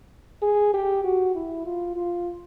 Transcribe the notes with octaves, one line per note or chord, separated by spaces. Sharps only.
G#4
G4
F#4
E4
F4
F4